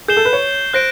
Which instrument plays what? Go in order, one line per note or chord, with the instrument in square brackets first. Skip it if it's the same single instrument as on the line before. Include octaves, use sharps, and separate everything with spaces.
[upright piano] G#4 [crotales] G6 C7 E7 G7
[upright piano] A4
B4
C#5
[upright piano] C5 [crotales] F#6 A#6 D7